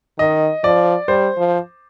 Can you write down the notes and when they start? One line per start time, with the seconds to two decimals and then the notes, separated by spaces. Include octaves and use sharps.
0.19 D#3 D#5
0.64 F3 D5
1.08 G3 C5
1.38 F3